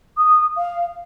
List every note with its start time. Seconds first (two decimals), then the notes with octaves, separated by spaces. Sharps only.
0.16 D#6
0.56 F5